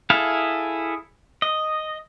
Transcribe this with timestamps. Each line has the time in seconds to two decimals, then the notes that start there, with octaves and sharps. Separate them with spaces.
0.10 E4 G#4 A4 F5
1.42 D#5